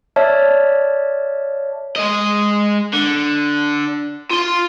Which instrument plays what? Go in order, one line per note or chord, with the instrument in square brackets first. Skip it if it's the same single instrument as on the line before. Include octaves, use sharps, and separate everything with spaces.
[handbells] C#5 D5 E5 A5 F6
[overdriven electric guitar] G#3 D#5
D3
F4 C6